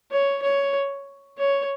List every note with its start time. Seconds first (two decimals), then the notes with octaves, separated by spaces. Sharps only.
0.12 C#5
0.43 C#5
1.38 C#5